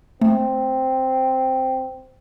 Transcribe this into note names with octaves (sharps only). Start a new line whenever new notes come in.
A3 C4